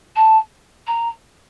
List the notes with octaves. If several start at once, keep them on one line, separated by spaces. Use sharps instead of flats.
A5
A#5